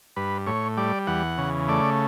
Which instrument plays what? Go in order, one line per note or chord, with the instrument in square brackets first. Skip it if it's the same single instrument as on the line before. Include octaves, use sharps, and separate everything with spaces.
[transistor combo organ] G2 B4
A2 C#5
G3 D5
E2 F#5
C#3
A3 D5